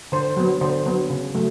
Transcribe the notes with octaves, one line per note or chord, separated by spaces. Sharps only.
D3 C5
F#3 B3
D3 C5
F#3 B3
C#3
F#3 A3